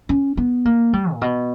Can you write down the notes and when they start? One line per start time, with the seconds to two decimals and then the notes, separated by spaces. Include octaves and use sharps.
0.09 C#4
0.37 B3
0.65 A#3
0.93 G3
1.13 A#2
1.21 B2